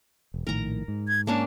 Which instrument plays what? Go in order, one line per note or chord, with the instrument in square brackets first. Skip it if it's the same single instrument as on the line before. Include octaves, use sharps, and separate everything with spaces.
[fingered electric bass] E1
[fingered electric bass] A#1 A2 D#3 [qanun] A#4 A#5
[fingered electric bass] G#2
[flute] G#6
[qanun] A#3 C#4 D4 [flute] A5